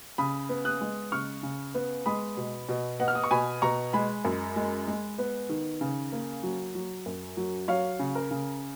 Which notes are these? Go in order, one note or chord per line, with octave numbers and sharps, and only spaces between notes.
C#3 B5 D#6
B3
D#6 F#6
G#3
C#3 C#6 F6
C#3
B3
G#3 B5 D#6
B2
B2
B3 D#5 F#5
F6
D#6
C#6
B2 G#5 B5
B2 A#5 C#6
G#3 G#5 B5
F#2
G#3
G#3
B3
D#3
C#3
A#3
F#3
F#3
F#2
F#3
F#3 C#5 F5
C#3
A#4
C#3